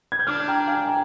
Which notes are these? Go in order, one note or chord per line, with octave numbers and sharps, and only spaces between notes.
G#6
G6
D4 D6 F6
G5 A#5
F5 G#5
G5 A#5